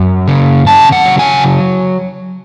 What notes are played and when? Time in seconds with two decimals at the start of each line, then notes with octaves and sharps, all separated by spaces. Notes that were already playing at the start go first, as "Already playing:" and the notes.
Already playing: F#2
0.28 C#3
0.67 C#3 A5
0.92 F#5
1.05 F#3
1.19 G#5